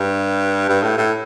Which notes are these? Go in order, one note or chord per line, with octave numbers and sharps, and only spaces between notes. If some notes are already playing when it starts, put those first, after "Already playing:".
Already playing: G2
G2
A2
A2